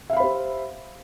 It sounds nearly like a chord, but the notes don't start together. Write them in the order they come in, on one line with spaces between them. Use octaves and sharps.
E5 F5 B5 C5 G4